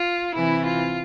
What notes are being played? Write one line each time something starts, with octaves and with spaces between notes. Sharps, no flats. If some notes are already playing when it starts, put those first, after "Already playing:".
Already playing: F4
C3 E3 E4
F4